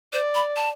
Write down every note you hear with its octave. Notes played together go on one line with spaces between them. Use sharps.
C5 D5
B5
A5